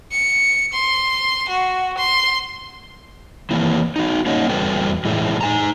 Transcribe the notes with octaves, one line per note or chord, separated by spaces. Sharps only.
C#7
C6
F#4
C6
D#3 E3 A#3 E4
D#4 F#4
A#3 C#4 D#4 C#5 D#5 F#5
E2 G3 F#4 A4 B4 G5
A2 E3 G#3 A3
D#4 G#5 A#5